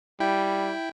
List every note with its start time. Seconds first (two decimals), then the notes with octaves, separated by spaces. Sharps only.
0.20 G3 E4 G5